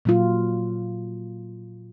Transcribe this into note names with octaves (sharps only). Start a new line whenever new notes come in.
A#2 F#3 F4